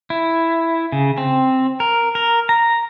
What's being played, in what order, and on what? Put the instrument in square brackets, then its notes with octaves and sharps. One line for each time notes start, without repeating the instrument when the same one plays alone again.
[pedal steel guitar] E4
C#3
C4
A#4
A#4
A#5